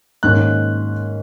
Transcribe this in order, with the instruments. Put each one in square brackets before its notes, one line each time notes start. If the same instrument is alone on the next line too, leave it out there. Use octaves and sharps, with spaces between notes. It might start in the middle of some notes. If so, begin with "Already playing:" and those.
[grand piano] G#2 D#3 A#3 C#4 F#6